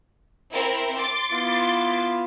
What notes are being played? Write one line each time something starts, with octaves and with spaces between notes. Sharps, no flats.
C4 E4 A#4
C6 D6 A6
B3 E4 F4